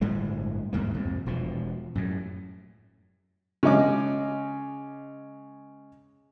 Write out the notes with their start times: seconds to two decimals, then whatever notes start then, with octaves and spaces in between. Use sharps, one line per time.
0.01 G1 A2 G3 G#3
0.73 E2 G#2 A#3
0.94 C2 F2 G#2
1.26 E1 B2 F3
1.95 F#2 A2
3.63 C#3 G#3 D#5 D6